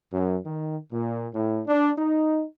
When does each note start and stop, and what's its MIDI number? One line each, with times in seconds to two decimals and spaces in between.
0.12 0.38 42
0.45 0.76 51
0.92 1.26 46
1.34 1.61 45
1.67 1.91 62
1.97 2.43 63